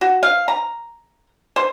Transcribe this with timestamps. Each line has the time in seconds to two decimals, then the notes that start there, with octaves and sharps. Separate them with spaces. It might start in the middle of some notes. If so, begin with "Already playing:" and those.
0.01 F#4
0.23 F5
0.48 A#5
1.56 C5